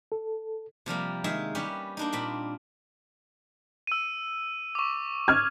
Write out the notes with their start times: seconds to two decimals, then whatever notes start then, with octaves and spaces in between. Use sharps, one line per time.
0.12 A4
0.86 C3 F3 G3 A#3
1.24 D#3 G#3 G#4 E5
1.55 G3 C#4 G4 B4
1.97 A#3 D4 D#4
2.13 A#2 C4 B5
3.87 E6 D#7
4.75 C#6 D6
5.28 F6 G#6